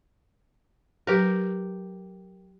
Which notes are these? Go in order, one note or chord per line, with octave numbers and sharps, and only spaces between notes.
F#3 G4 A#4 B4